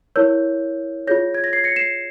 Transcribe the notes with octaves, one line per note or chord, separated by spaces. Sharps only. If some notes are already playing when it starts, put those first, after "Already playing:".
E4 A#4 C#5 E6 G6
F4 G#4 C#5 G6 A#6
G#6
A#6
G#6 C7
A#6 C#7
C7 E7